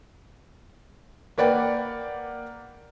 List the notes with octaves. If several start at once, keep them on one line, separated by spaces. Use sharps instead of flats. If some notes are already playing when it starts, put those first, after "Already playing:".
A#3 B4 D5 F#5 G5